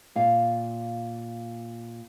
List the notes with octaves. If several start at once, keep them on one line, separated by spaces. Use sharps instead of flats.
A#2 F5